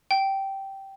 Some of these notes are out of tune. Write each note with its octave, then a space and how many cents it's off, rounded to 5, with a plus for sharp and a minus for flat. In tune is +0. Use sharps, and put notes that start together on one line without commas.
G5 -10